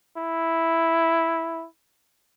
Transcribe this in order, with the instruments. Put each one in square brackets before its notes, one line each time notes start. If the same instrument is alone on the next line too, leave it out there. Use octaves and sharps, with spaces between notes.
[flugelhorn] E4